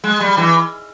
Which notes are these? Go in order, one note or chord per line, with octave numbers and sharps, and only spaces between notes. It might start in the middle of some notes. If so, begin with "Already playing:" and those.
G#3
G3
E3